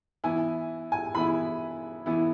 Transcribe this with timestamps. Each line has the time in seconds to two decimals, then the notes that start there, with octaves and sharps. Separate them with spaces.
0.24 E3 B3 E4 G#5
0.92 G#5
1.15 E3 B3 E4 B5
2.06 E3 B3 E4